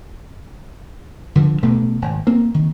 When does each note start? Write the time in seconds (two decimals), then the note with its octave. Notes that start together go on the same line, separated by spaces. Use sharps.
1.35 D3 E3 F3
1.62 A1 B2 A3 B3
2.02 G#1
2.27 A#3 C4
2.54 D#3